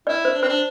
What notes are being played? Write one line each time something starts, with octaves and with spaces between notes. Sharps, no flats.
E4 D5
C5
D4
C4 C5
D4